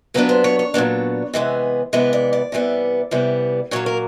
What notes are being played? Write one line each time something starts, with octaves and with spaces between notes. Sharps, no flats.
A#2 F#3 B3 D4 B4
C5
C#5
C#5
A#2 F#3 B3 D4
C3 E3 G#3 B3
C3 E3 G#3 B3 B4
D5
D5
C3 E3 G3 B3
C3 E3 G3 B3
A#2 F#3 A#3 C#5
A#4